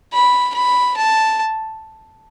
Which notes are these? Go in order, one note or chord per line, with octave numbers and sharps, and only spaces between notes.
B5
B5
A5